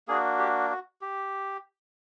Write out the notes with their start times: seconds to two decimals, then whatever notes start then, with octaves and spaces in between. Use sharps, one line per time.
0.08 A#3 D4 F#4 G#4
0.39 G4
0.70 F#4
1.01 G4